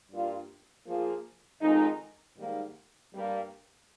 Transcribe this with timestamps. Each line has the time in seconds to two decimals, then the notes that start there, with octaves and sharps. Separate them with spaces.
0.10 G2 G3 A#3 F4
0.85 F3 A#3 F4 G#4
1.61 F2 D#3 G#3 D#4
2.36 G#2 D#3 G3 A#3
3.12 G2 G3 A#3